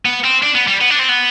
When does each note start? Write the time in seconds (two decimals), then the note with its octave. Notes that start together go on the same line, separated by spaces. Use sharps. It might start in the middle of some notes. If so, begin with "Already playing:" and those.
0.05 B3
0.24 C4
0.43 D4
0.55 B3
0.68 G3
0.81 B3
0.90 D4
0.99 C4
1.08 B3